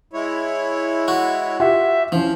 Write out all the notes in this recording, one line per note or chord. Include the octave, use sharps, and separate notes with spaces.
G#3 E4 C#5
F#4
F4 G4 E5 F#5
E3 F3 C#4 C5